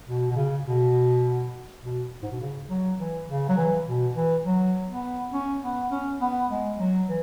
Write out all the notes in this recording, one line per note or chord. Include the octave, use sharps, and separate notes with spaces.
B2
B2
C#3
B2
B2
G#2
B2
C#3
F#3
E3
C#3
F#3
E3
B2
E3
F#3
B3
C#4
B3
C#4
B3
G#3
F#3
E3